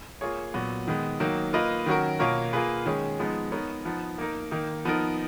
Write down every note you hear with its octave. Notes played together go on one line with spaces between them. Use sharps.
A#3 F4 G#4 C#5
A#2 F#3 B3 F#4
D#3 G#3 B3
D#3 F#3 A#3 D#4
A#3 F4 B4 D#5
D#3 F#3 C#4 F#4 A#4
B2 A#3 F4 A#4 C#5
A#3 F4 G#4 B4
D#3 G#3 C#4 G#4
F3 G#3 B3 D#4
B3 D#4 A#4 C#5
F3 B3 D#4
A#3 D#4 A#4
D#3 A#3 D#4
F3 B3 D#4 A#4